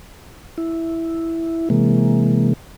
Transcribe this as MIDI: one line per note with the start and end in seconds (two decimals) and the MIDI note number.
0.58 1.69 64
1.70 2.53 48
1.70 2.53 52
1.70 2.53 56
1.70 2.53 58